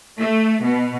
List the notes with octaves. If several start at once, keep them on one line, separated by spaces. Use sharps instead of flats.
A3
B2